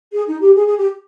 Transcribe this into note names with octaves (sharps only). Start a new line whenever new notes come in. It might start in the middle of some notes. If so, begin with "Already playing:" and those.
G#4
D#4
G4
G#4
G#4
G4